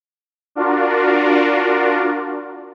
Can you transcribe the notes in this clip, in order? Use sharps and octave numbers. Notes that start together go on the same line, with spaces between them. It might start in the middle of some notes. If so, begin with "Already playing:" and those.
D4 F4 F#4 A#4 D5